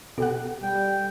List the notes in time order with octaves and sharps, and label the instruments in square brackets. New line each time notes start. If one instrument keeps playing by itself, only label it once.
[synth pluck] B2 G4 F#5 [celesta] A4
[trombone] G3 [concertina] G5